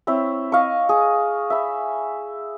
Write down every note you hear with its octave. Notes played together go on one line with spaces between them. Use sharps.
C4 E4 C#5 E5
D#5 F5 C#6
G#4
E5 B5